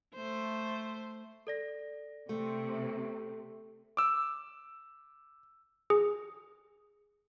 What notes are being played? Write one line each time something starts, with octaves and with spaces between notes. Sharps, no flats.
A3 C5
A4 D5 A#6
C3 A3
D6 E6
G#4